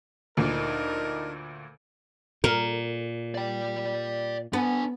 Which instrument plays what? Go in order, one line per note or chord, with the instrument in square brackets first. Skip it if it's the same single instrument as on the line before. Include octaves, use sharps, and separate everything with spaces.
[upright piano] D2 A#2 [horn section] D4 D#4 A#4
[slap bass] A#2 [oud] A#4
[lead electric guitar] D5 G5
[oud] B3 [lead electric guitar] D4 G#5